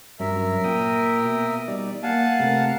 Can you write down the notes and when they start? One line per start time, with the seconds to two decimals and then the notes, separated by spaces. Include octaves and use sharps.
0.20 G2 F#3 C#4 A#4 E5
0.64 A#2 A#3 G5 D#6
1.23 B2
1.68 G3 D#4 D5
2.03 A#3 F5 F#5 G#5 A5
2.40 C3 A3 A#4